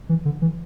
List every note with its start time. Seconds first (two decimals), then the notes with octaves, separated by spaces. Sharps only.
0.09 E3
0.25 D3
0.42 E3